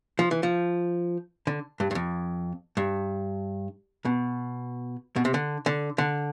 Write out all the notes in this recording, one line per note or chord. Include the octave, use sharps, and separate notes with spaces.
F3
E3
F3
D3
G2
G2
F2
G2
B2
B2
C3
D3
D3
D3